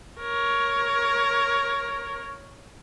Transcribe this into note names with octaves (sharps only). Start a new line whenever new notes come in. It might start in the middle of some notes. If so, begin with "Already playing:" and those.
A#4 C#5